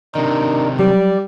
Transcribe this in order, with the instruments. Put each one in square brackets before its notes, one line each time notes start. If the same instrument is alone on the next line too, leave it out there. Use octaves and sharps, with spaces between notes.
[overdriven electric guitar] C3 D#3 [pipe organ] D4 D#4 A#4
[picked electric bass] F#3 [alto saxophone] G3 [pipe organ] D5